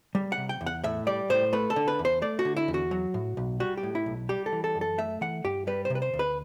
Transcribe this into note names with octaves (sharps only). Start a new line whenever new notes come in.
G3
F#5
C3
G5
E2
F#5
A2 E5
G3 D5
A2 C5
A3 B4
A4
D3
B4
E2
C5
A3 D5
F#4
D3
E4
E2
F#4
F#3
A2
B1
G3 F#4
G4
A2
E4
B1
G3 G4
A4
E3
A4
F#2
A4
A3 E5
E3 F#5
G2 G4
G3 B4
C5
C3
B4
C5
D2
B4